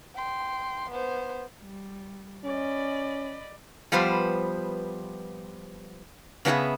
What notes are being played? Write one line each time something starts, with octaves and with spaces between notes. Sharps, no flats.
G5 C6
B3 C5
G3
C#4 D5 D#5 B5
F3 G3 B3 B4 C5
C#3 B3 D4 G#4 E5